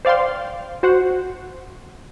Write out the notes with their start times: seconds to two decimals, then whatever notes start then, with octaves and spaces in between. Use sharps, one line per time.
0.05 C5 D5 F5 G5 C6
0.83 F#4 C5 F#5